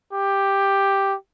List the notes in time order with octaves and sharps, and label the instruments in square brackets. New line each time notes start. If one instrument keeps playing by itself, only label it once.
[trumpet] G4